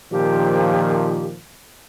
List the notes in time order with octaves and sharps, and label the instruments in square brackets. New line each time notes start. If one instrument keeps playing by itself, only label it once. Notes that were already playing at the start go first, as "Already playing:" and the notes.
[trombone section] A#2 D#3 F3 [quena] G4